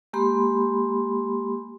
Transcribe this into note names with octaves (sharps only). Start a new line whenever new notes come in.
G#3 A#3 G4 B5 C6